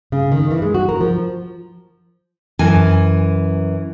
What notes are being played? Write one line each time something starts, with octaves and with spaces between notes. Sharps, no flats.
C#3
D#3
E3
G#3
F#4
A#4
F3
F#2 E3 G#5